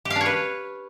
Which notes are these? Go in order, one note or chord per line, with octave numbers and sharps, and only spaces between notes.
G4
F5
D4
C#5
B4